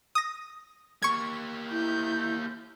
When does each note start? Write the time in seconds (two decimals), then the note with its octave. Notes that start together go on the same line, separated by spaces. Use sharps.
0.15 D#6 A#6
1.02 A#3 G4 C#6 G#6
1.71 E4 G6